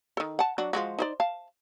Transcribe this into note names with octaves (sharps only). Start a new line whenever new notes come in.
D#3 A4
F#5 A5
F#3 D4 F#4
F3 G#3 F#4
D#4 C5 D5
F5 A5